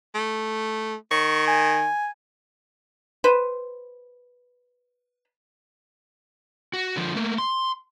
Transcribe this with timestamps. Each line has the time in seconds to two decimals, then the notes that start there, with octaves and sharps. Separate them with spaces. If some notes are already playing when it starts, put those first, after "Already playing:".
0.15 A3
1.11 D#3 C#6
1.47 G#5
3.24 B4 C5
6.73 F#4
6.96 D3 F3
7.16 A3 A#3
7.38 C6